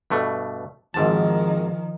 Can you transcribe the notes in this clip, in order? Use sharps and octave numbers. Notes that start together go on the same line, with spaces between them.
G2 B2 A3
G#1 G#2 D#3 F3 A5